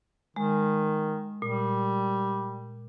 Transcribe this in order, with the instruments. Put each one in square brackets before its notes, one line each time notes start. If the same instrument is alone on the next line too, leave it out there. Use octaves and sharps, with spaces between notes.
[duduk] D#3 [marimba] G#3
[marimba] A#2 [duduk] G3